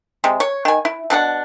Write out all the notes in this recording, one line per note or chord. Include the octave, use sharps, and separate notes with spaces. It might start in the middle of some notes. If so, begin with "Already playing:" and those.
C3 G#3
C#5
D#3 G#5
E4
B2 D4 D#4 F#5